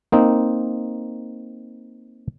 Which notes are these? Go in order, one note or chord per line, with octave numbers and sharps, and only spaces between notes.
A#3 C4 D#4